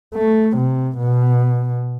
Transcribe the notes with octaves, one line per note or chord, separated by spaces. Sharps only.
A3
C3
B2